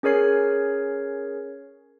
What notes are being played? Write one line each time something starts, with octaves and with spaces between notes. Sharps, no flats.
C#4 G#4 A#4 C#5 C7